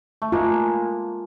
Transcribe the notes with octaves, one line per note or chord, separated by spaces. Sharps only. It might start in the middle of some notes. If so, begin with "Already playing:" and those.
A3
G#3 A#3 F4